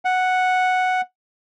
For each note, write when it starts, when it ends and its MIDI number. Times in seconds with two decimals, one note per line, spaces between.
0.05 1.01 78